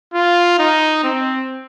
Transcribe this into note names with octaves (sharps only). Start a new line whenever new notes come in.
F4
D#4
C4